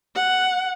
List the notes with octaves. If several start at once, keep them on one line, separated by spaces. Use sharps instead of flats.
F#5